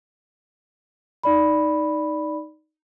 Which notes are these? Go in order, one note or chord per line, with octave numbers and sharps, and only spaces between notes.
D#4 D5 B5